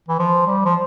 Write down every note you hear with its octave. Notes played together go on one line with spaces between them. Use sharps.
E3
F3
G3
F3